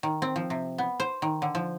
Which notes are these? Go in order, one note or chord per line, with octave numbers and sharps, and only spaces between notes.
D#3
C4
F3
C3
B3
C5
D#3
D3
F3